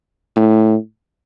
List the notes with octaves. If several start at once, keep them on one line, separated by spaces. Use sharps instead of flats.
A2